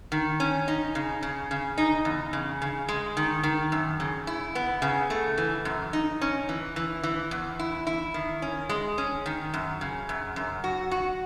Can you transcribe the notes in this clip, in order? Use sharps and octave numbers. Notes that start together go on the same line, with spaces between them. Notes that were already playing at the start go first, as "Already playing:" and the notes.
D#3
C#4
D#4
C#3
C#3
C#3
D#4
E2
C#3
C#3
G#3
D#3
D#3
F#2
C#3
E4
B3
C#3
A3
E3
F#2
D#4
C#4
E3
E3
E3
E2
E4
E4
D#3
C#4
G#3
C#4
D#3
F#2
C#3
F#2
F#2
F#4
F#4